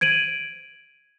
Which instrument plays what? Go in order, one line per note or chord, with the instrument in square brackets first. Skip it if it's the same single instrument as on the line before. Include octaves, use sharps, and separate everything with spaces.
[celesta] G#6 D7 D#7 F#7